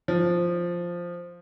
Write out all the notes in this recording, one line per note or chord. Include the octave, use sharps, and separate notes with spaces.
F3